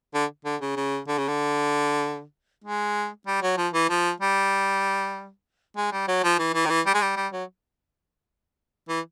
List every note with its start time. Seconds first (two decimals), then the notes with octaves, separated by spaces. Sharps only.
0.14 D3
0.45 D3
0.61 C#3
0.76 C#3
1.08 D3
1.18 C#3
1.28 D3
2.64 G#3
3.27 G3
3.42 F#3
3.57 F3
3.73 E3
3.89 F3
4.20 G3
5.77 G#3
5.92 G3
6.08 F#3
6.24 F3
6.39 E3
6.54 E3
6.65 D#3
6.70 E3
6.86 G3
6.94 G#3
7.02 G3
7.16 G3
7.33 F#3
8.89 E3